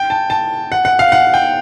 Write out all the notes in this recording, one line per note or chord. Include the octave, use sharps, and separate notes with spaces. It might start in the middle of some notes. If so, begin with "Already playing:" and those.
Already playing: G5
A5
A5
F#5
F#5
F5
F#5
G5